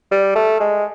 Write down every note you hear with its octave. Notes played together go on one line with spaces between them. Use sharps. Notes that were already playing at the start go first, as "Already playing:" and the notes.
G3
A3
G#3